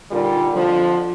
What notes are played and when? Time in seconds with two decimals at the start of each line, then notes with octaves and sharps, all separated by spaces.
0.11 A#2 D3 D#3 G3 F4
0.54 F2 D3 F3